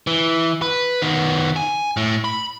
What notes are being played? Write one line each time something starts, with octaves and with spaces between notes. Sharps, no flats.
E3
B4
D#3 B3
G#5
A2
B5